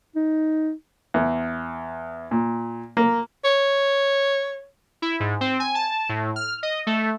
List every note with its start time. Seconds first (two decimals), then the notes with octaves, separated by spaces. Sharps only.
0.16 D#4
1.14 E2
2.31 A#2
2.97 A#3
3.45 C#5
5.02 E4
5.20 G#2
5.41 C4
5.60 G#5
5.75 A5
6.09 A2
6.36 F6
6.63 D#5
6.87 A3